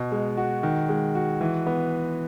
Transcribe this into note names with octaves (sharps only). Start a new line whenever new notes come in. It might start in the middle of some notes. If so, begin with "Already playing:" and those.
Already playing: B2
G#3
F#4
D#3
G#3
F#4
E3
B3